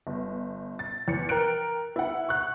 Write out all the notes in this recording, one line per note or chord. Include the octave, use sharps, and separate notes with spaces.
G1
A6
E2 C#7
A#4 G5 F#6 D7
E4 F#5
C#6 F#6